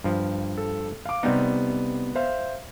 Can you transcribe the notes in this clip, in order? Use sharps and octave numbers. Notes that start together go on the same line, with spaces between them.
G2 F3
A4
F5 D6
C3 G3 B3 D#4
C5 E5 F5